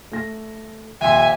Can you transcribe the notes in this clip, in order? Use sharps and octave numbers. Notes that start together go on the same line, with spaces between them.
A3 A#6
D#1 F2 E5 G5 G#5 C6